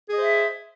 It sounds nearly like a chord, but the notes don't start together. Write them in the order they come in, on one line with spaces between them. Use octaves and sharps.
G#4 D#5 C5 E5